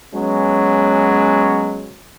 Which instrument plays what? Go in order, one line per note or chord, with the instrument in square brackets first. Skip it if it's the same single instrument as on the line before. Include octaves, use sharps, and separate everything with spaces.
[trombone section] F#3 G#3 B3 C#4